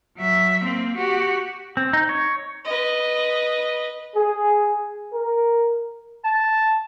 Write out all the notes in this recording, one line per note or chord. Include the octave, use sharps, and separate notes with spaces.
F#3 E5
A#3 C4
F#4 G4
C4
D#4
C#5
B4 D#5
G#4
A#4
A5